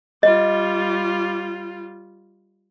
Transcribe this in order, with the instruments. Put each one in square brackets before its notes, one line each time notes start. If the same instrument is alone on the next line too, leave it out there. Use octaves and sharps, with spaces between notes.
[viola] G3 F4 [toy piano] D#5